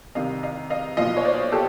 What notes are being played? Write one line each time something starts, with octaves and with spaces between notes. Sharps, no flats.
C2 C3 D#3 D#5 F5
D#5 F5
D#5 F5
B1 A#2 F3 D#5 F5
C#5
C5 D5
G4 A4